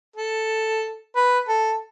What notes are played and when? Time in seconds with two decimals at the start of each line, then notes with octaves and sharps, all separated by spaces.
0.16 A4
1.16 B4
1.48 A4